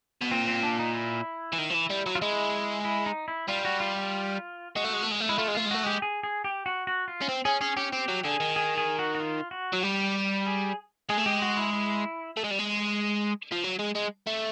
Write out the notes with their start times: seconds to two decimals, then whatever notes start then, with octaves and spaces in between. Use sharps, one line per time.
0.22 B2
0.31 A#2 C4
0.48 C4
0.63 D4
0.79 D#4
0.95 E4
1.53 E3
1.58 D#3
1.70 F3
1.74 E3
1.90 G3
2.06 F#3
2.15 F4
2.22 G#3 E4
2.85 E4
3.06 D#4
3.28 E4
3.48 G3 F4
3.65 F#4
3.80 F4
3.96 F4
4.76 G#3 F#4
4.84 A3
4.93 G#3
5.03 A3
5.11 G#3
5.20 A3
5.29 G#3 E4
5.38 A3 F4
5.48 G#3
5.55 A3 F4
5.66 G#3
5.71 A3 F#4
5.83 G#3 G4
6.02 G#4
6.23 G#4
6.44 G4
6.66 F#4
6.87 F#4
7.08 F4
7.22 C#4
7.29 C4
7.45 C#4 G#4
7.61 C#4 G#4
7.77 C#4 G4
7.93 C4 G4
8.09 F#3
8.25 D3 G#4
8.40 D#3
8.56 G#4
8.78 G#4
8.99 F#4
9.15 F#4
9.20 F4
9.51 F#4
9.73 F#3
9.83 G3 G4
10.47 G#4
11.09 G#3 G#4
11.18 A3
11.26 G#3 G4
11.42 F#4
11.57 E4
11.73 E4
12.37 A3
12.44 G#3
12.51 G3
12.59 G#3
13.52 F3
13.64 F#3
13.79 G#3
13.96 G#3
14.27 A3